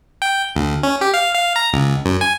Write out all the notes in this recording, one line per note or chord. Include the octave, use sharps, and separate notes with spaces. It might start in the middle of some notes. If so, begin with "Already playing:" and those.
G5
D2
C#4
G4
F5
F5
A#5
C#2
F#2
G#5